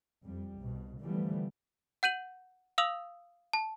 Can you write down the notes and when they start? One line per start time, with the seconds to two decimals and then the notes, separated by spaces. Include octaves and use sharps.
0.23 F2 G3
0.61 C2 B2
1.03 D3 E3 F3 G3 A3 B3
2.03 F#5 G6 D#7 F#7
2.78 F5 D#6 E6 F7 F#7
3.53 A5